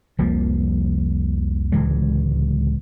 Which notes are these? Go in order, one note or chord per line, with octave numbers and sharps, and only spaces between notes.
F1 C2 F3 A#3
D1 C#2 E3 G#3